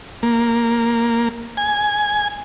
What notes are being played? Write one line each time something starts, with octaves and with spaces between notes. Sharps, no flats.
A#3
G#5